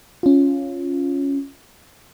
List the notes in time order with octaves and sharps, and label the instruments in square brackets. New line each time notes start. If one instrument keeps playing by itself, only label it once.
[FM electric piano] C#4 F4